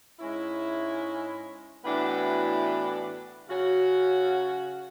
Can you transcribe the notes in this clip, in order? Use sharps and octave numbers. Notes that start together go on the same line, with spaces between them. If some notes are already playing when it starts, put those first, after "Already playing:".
G#2 G#3 C#4 E4
A2 E3 B3 D4 F#4
C#3 F#3 C#4 F#4